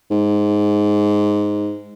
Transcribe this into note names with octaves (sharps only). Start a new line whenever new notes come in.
G#2